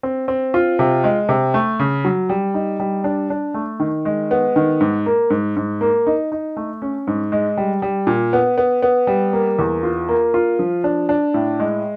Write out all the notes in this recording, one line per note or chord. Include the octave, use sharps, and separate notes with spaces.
C4
C4
F4
C3
G#3
C3
A3
C#3
F#3
G3
D#4
G3
D4
D4
A3
D#3
G#3
B3
D#3
G#2
A#3
G#2
G#2
A#3
D#4
D#4
A3
C#4
G#2
G#3
G3
G3
A#2
B3
B3
B3
G3
A#3
E2
F4
A#3
F4
F3
D4
D4
A2
G#3